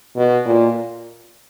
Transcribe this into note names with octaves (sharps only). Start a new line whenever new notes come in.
B2
A#2